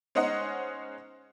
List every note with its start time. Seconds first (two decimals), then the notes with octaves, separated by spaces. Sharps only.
0.15 G#3 C#4 D#4 C5 D#5 F#5